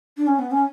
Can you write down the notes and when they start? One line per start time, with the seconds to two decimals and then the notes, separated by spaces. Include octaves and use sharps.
0.17 D4
0.27 C#4
0.39 B3
0.51 C#4